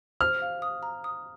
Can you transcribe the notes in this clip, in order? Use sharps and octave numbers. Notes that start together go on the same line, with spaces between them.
C5 F6
F5
D#6
A#5
D#6